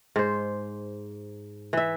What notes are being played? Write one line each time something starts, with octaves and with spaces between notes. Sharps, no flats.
G#2 C5
E3 E5